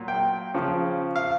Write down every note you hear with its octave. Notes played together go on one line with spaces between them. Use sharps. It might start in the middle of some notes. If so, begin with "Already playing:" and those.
Already playing: A#2 F#3
G5
C#3 F3
F5